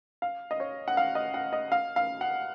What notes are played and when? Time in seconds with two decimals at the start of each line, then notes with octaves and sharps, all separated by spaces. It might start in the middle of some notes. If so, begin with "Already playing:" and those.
0.22 F5
0.51 D#5
0.60 C#5
0.88 F#5
0.97 F5
1.15 D#5
1.34 F#5
1.53 D#5
1.72 F5
1.96 F5
2.21 F#5